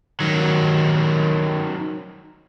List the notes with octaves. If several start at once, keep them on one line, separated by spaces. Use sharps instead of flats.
D#3 F#3